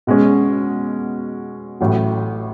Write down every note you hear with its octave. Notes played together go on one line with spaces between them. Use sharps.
B2 G#3 C#4
A1 A2 F#3